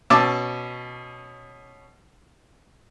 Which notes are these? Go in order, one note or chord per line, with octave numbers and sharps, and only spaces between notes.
B2 C#4 A5 D6 E6